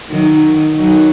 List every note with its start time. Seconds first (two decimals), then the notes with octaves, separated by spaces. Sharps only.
0.09 D#3 F#3
0.79 D#3 F#3